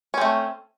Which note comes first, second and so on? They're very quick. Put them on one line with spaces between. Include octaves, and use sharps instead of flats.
C#4 C4 A3